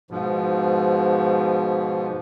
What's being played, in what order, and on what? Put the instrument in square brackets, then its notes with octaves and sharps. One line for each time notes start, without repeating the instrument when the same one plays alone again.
[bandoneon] G#2 B2 F3